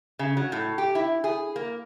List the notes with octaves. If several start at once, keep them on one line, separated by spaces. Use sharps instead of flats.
C#3
F#3
A2
G4
E4
G#4
A#3